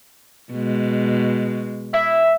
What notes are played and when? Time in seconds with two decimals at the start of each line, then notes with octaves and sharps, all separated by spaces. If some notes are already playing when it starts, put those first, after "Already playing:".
0.52 B2 G#3
1.94 E4 E5